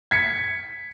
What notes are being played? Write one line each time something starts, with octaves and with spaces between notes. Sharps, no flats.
G#6 B6 C#7